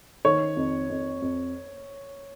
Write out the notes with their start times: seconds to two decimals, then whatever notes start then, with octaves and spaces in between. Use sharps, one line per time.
0.25 D#3 C#5
0.57 F2
0.90 F2
1.22 F2